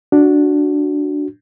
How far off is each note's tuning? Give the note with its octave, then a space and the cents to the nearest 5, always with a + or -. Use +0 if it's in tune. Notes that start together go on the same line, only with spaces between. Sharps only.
D4 +0 F#4 +0